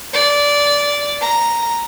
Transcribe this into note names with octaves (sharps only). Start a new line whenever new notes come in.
D5
A#5